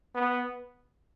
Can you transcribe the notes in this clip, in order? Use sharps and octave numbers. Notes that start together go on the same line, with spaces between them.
B3